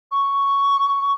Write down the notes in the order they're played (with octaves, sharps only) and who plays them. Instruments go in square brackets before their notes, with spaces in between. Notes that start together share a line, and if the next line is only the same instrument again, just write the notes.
[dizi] C#6